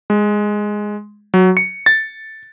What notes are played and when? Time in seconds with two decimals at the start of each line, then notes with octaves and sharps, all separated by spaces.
0.10 G#3
1.34 F#3
1.57 C#7
1.86 A6